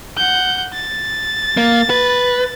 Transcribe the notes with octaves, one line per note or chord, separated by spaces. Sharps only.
F#5 G6
A6
A#3
B4